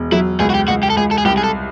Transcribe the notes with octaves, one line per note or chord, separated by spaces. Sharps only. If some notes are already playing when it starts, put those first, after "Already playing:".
Already playing: E1
F#3 E4
C#2 G#4
F#4
G4
C#2 F#4
G4
A4
C#2 G#4
A4
G#4
C2 G4
G#4
A4